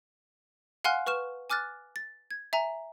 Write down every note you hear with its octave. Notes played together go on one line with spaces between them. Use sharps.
F5 F#5 G#5 C6 F6 F#6
B4 C#6 F6 E7
G#5 D6 F6 F#6 A6
A6
G#6
E5 G#5 A#5